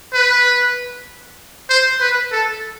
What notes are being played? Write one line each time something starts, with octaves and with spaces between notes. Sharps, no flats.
B4
C5
B4
A4